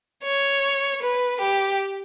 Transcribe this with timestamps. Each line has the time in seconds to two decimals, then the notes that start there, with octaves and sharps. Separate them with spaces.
0.24 C#5
1.02 B4
1.41 G4